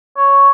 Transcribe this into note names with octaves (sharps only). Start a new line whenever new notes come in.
C#5